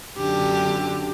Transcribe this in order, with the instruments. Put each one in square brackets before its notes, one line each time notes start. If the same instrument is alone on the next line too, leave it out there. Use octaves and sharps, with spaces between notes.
[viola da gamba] F#2 D3 G4